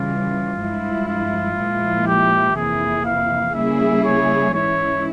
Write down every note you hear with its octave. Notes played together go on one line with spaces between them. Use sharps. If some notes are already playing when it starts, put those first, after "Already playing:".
Already playing: C#3 E3 G3 F4
G2 F3 G#3 E4
F4
A#2 F3 G#3 E4
G4
F2 C3 E3 A#3 E4 G#4
F5
C#3 G3 A#3 E4 G#4 E5
C#5
G#2 E3 G#3 C#4 E4 C#5